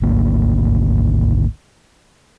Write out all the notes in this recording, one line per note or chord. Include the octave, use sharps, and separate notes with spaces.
G#1 D2 A#3